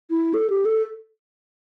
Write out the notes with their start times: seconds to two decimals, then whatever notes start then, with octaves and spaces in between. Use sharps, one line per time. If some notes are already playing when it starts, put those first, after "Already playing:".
0.10 E4
0.34 A4
0.50 G4
0.65 A4